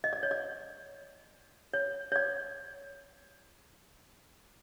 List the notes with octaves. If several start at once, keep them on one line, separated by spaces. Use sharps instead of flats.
D#5
D5
C#5
D5
C#5
C#5
D5